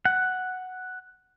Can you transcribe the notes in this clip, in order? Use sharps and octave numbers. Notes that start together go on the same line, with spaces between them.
F#5